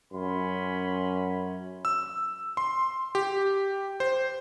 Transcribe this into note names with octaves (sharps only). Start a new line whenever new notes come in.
F#2 C#4 B5 C6
E6
C6
G4
C5